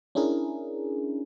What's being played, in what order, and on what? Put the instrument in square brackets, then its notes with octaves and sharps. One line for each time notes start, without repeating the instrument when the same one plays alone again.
[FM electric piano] C#4 D4 E4 G#4 A#4